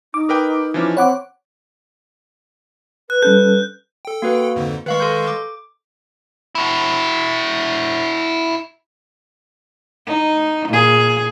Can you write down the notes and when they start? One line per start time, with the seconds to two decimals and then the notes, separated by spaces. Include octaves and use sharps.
0.14 D#4 D6
0.29 A#4 B4 G5
0.74 E3 F3 C#4
0.97 C4 C#5 F#5 B5 D6
3.10 B4 F#6
3.22 G3 C#4 A4 G6
4.05 A4 G5
4.22 A#3 F#4 B4
4.56 F2 G#2 D3
4.86 D#3 G#3 B4 F5 C#6
5.00 A4 C6 G6
5.28 D6
6.55 E4 F#4
10.07 D#4
10.69 A#2 G#4